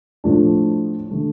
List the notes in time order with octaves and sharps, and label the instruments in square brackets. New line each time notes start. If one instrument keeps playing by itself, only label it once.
[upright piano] A2 F3 A3 D4
D3 A3